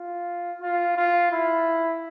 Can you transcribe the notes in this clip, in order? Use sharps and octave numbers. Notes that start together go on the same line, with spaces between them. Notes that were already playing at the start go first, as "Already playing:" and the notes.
Already playing: F4
F4
F4
E4